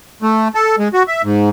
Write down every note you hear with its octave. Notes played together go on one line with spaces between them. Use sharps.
A3
A4
G#3
F#4
E5
G#2